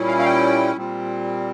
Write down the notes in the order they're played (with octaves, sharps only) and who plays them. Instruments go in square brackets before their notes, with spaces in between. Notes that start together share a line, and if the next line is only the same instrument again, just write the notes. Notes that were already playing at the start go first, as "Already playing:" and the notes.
Already playing: [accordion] A#2 G3 C#4 E4
F5
F5
G5
A#2 G3 C4